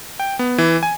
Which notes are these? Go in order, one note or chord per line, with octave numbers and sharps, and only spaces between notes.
G5
B3
E3
G#5